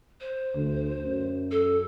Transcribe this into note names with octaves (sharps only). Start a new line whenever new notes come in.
C5
D2
F#2
A4